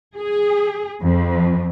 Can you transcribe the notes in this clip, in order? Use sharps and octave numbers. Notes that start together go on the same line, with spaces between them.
G#4
F2